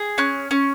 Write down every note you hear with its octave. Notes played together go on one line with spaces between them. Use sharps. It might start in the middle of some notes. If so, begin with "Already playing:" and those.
Already playing: G#4
C#4 F#6
C#4